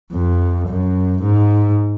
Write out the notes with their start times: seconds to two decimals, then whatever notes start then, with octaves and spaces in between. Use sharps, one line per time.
0.13 F2
0.68 F#2
1.22 G#2